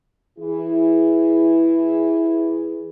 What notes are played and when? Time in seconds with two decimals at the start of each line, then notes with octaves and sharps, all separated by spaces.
0.39 E3 E4 G#4